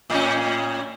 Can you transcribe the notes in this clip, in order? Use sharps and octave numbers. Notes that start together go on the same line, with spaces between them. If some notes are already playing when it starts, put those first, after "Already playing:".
A2 C#4